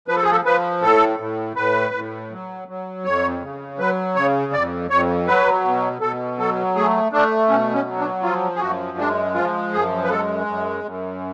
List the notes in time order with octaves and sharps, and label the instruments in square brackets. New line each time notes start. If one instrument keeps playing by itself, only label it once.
[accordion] F3 B4
A4
G#4
A4
F3 B4
A2 A4
A2
A2 B4
A2
F#3
F#3
F2 C#5
C#3
F#3 B4
C#3 C#5
F2 D5
F2 C#5
F#3 B4
B2
B2 A4
F#3 A4
A3 G#4
A3 D4
B2 C#4
C#4
F#3
D4
F3 F4
G#4
F#2 F#4
G#3 D4
F3 F4
F#2 G#4
B4
G#3 A4
F#2
F#2